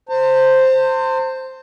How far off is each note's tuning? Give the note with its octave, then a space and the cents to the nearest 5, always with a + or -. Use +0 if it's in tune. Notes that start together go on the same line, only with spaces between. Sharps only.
C5 +0 A5 +45